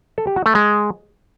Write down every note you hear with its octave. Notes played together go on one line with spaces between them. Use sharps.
A4
G4
F#4
A3
G#3